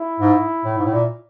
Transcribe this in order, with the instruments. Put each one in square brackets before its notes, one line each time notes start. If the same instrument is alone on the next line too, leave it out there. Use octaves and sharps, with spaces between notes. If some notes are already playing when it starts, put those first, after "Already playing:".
Already playing: [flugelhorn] E4
[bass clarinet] G#2
A2
G#2
A2
A#2